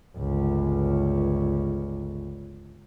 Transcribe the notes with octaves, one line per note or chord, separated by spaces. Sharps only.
G1 C#2